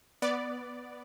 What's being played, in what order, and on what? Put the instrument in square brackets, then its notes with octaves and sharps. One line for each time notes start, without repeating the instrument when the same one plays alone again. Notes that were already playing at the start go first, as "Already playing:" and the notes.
[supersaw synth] B3 D5